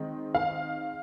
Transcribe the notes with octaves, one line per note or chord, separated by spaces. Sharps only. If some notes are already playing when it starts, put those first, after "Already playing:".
Already playing: D#3 G#3 C4 D#4
F5